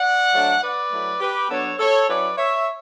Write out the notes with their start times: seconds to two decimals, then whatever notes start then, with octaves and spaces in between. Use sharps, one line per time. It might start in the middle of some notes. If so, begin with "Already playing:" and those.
Already playing: D5 F#5
0.33 F#3 A3 D4
0.62 B4 D5
0.92 F#3 A3 E4
1.20 G4 B4
1.50 F#3 B3 D4 A4 C#5
1.79 A4 C#5
2.08 F#3 C#4 E4 B4 D5
2.37 C#5 E5